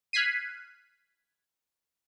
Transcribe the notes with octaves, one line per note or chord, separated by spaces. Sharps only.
F6 F#6 G#6 B6 C7 D#7